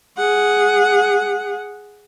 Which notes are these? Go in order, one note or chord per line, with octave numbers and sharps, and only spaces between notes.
G#4 F#5